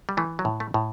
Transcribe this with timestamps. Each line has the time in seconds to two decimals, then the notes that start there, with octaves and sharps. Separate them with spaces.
0.09 G3
0.17 E3 A3
0.39 F#3
0.45 A2
0.60 A3
0.74 A2